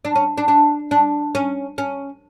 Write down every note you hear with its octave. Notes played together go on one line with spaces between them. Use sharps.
D4
C#4
D4
D4
D4
C#4
C#4